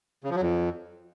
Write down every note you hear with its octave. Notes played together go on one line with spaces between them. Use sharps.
C#3
F3
F#3
F2